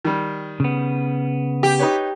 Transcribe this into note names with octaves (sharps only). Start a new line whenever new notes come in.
D#3 G3
C#3 B3
G4
D#4 B4 C#5